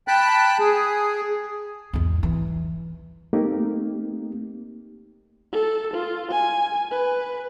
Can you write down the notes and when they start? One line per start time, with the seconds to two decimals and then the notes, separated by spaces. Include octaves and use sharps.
0.08 G5 A5 B5 F#6
0.59 G#4
1.93 E2 G#2
2.23 E3
3.33 A3 A#3 C4 D#4 G4
5.52 A4
5.93 F4
6.31 G#5
6.91 B4